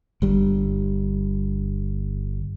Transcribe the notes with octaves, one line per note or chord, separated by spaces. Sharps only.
G1 G3